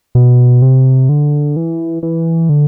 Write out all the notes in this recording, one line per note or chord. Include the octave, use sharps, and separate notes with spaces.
B2
C3
D3
E3
E3
D3